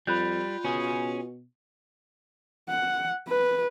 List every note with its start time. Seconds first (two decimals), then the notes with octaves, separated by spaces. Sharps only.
0.07 F2 G3 F4 B5 F#6 G6
0.65 B2 C#4 G#4
2.69 F#5
3.29 B4